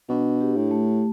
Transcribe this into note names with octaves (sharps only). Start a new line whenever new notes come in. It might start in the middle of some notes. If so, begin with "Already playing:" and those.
B2 D4
G4
A2
A3